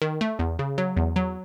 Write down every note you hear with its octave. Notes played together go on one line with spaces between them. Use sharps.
D#3
A3
E2
C#3
F#3
E2
F#3